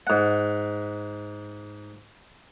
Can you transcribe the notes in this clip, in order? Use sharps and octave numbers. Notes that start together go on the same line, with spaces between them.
G#2 F#5